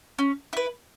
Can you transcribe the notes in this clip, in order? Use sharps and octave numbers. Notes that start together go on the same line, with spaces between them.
C#4
E4 B4